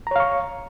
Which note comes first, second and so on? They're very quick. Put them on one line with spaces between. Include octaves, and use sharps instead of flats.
A#5 C#5 F5 C#6